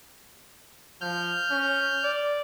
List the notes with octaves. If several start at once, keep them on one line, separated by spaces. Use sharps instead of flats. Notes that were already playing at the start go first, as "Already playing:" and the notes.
F3 F6 G6
C#4
D5